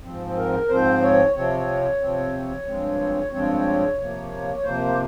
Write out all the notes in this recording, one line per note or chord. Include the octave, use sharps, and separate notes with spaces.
G#2 F3 C4
A#4
G#2 F3 C4 C5
C#5
C3 F3 C4 C#5
C3 F3 C4
G2 F3 G#3 C4
G2 F3 G#3 C4 C#5
C3 F3 A#3
C#5
C3 F3 A#3 C5
G4